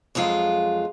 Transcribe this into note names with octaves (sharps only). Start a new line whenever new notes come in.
F2 F#3 G#3 F4